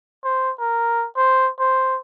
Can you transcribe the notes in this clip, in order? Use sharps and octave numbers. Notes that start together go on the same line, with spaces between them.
C5
A#4
C5
C5